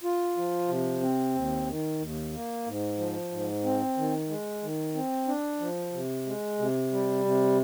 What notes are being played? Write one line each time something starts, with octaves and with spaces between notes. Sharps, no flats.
F4
F3
C3
C4
D#2
D#3
D#2
A#3
G#2
F3
G#2
C4
D#3
G#3
D#3
C4
D4
F3
C3
G#3
C3
G3
C3